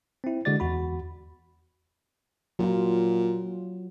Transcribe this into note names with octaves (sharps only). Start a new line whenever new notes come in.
C4 E4
D3 G#3 F#4 D5 A6
E2 F#4 B5
A#2 F#3 F4